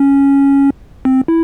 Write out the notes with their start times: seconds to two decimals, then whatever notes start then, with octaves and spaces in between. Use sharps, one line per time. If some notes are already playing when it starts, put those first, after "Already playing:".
Already playing: C#4
1.05 C4
1.28 E4